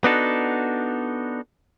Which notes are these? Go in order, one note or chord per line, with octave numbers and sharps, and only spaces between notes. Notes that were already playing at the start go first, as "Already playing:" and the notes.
B3 D4 D#4 F#4 A4